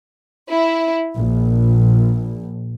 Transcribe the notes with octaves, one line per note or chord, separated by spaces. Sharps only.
E4
A#1